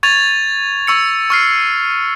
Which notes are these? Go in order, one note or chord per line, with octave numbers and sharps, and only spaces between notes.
C#6 G#6 A6 F7
C#6 E6 C#7
C#6 F6 C7